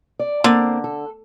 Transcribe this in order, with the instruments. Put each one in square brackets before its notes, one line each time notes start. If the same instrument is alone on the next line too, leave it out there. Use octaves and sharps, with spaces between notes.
[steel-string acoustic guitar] D5
[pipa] D3 [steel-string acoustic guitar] A#3 C4
[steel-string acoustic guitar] A4